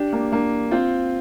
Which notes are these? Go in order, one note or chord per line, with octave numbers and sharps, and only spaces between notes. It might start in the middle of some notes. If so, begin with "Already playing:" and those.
Already playing: D4 G4
A#3 D4
A#3 D4
C4 F4